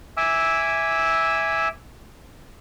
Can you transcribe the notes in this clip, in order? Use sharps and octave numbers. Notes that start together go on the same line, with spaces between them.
E5 G#5 D6 E6